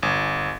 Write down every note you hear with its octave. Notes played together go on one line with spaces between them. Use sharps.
G1